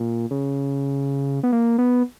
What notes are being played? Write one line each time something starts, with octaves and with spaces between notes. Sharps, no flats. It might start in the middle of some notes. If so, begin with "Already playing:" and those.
Already playing: A#2
C#3
B3
A#3
B3